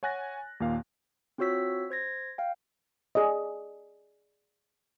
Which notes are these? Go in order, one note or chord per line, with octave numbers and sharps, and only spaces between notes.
C#5 F#5 G#5 F#6 A6 A#6
D#2 A#2 A#3 F5
C4 F4 F#4 C#5 E6 B6
C5 G#6 A#6
F5 G5
G#4 D5 D#5